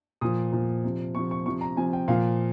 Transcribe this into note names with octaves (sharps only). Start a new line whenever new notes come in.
A#2 F3 D#6
A#2 F3
C3 F3
C3 F3 C#6
C#6
C3 F3 C#6
A#5
C3 F3 G#5
G5
A#2 F3 F5